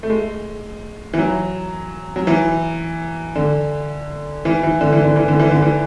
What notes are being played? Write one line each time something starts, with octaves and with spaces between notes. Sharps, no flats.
A3
G#3
E3
F#3
F#3
E3
D3
E3
E3
D3
E3
D3
E3
D3
E3
D3
E3